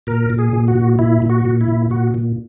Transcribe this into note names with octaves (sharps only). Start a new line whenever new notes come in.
A#2 A#4
A#2
G#4
A#2
F#4
A#2
A#2 E4
A#2
F#4
A#2
E4
A#2
A#2 F#4
A#2